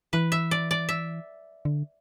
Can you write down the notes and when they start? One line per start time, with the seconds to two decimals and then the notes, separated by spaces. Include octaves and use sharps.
0.13 E3 B4
0.32 E5
0.51 D5
0.71 D5
0.89 E5
1.65 D3